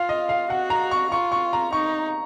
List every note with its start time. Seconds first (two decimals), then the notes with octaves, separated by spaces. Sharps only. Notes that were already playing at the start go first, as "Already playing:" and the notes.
Already playing: F4 F5
0.09 D#5
0.29 F5
0.49 F#4 F#5
0.70 A#5
0.91 C#6
1.11 F4 C#6
1.32 C#6
1.53 A#5
1.73 D#4 C#6